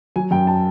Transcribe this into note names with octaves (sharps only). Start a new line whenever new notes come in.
F#3 G#5
F#2 G5
A5